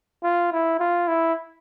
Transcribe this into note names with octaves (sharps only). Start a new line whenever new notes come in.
F4
E4
F4
E4